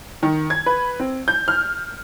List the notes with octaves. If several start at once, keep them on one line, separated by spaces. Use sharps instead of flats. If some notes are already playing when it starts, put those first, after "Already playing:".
D#3
G#6
B4
C4
G6
F6